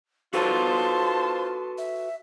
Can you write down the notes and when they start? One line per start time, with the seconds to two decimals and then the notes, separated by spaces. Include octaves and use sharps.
0.34 F4 F#4 A4 B4 C5 A5 C6
1.78 E5